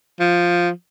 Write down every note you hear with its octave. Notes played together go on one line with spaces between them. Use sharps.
F3